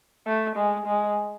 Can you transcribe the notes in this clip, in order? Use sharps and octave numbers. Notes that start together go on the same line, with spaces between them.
A3
G#3
G#3